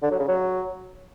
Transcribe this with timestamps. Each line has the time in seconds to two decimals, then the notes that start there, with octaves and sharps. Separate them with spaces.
0.03 D3
0.11 F#3
0.20 C#3
0.28 F#3